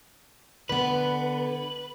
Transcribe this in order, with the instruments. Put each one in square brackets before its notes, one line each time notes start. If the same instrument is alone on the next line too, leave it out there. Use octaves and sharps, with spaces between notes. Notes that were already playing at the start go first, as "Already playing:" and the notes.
[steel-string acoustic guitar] D3 B3 [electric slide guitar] B4